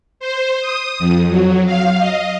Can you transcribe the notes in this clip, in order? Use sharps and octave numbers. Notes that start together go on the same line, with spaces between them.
C5
D#6
F2
F#3
F5
D#5